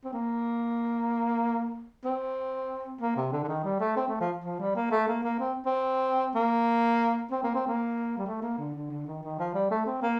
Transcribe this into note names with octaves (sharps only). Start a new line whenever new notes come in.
C4
A#3
C4
A#3
C3
D3
D3
D#3
G3
A3
C4
A3
F3
F3
G3
A#3
A3
A#3
A#3
C4
C4
A#3
C4
A#3
C4
A#3
G3
A3
A#3
D3
D3
D3
D#3
D#3
F3
G3
A3
C4
A#3